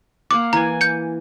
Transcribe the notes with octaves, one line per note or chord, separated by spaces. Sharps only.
A#3 F5 F#5 D6
E3 G#5 A#5
G6 C#7